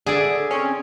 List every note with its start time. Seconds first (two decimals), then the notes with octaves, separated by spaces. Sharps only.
0.06 D3 G#4 D5 E5
0.51 C4 C#4